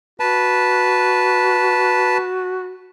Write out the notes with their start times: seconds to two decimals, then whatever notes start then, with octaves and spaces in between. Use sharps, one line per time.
0.20 F#4 B4 A5